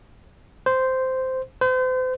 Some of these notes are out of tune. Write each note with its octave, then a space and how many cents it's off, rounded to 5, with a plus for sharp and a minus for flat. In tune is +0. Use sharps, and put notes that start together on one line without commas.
C5 -10
C5 -40